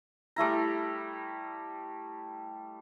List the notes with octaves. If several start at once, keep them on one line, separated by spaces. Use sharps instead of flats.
G3 A3 E4 A#5